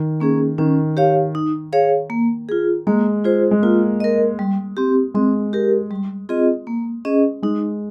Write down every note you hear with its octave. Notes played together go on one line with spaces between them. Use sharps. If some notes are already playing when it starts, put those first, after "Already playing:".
Already playing: D#3
A#3 C#4 G#4
D#3 C#4
G4 C#5 F5
D#4
G#4 C#5 F5
A#3
F4 G#4
G#3 A#3
F4 G#4 C5
G#3
A#3 F4
A#4 D#5
G3
C4 G4
G#3 C4
G4 A#4
G3
C4 F4 G#4 D#5
A#3
C#4 G#4 D#5
G#3 D#4